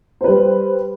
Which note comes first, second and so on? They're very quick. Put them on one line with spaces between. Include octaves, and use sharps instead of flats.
C5 B4 G3